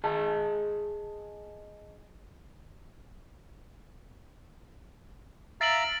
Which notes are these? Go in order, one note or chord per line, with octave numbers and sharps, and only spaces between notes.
G#4 D#5 A5
E5 F5 A#5 A6 D7 F#7